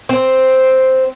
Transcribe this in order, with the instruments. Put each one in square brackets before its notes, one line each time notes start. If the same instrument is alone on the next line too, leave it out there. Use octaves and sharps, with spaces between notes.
[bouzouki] C4